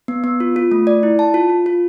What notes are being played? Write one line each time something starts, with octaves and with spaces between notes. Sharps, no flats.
B3
B3
F4
F4
A3
D5
E4
A5
F4
F4
F4